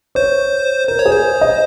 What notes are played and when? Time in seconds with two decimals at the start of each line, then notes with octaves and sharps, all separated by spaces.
0.15 C5 C#5
0.88 A#4 C5
0.99 C#5
1.06 G#4
1.11 C5
1.41 D#5